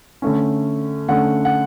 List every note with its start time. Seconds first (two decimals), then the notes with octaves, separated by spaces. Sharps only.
0.22 D3 A3 C#4
1.09 D3 A3 C#4 F#5
1.45 F#5